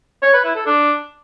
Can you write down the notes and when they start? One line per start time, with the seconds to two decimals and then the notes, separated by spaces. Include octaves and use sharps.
0.23 C#5
0.33 B4
0.44 E4
0.55 A4
0.66 D4